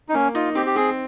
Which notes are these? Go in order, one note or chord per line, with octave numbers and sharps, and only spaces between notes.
D#4
A#3 C#4
D#4 F4
C4 G4
G4
C4 G#4